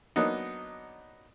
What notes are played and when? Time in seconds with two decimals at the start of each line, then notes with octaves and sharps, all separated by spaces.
0.16 F#3 A#3 B3 D4 D#4